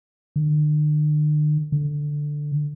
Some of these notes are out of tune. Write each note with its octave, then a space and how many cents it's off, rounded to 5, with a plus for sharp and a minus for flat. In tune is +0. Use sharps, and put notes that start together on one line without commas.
D3 +45
D3 +5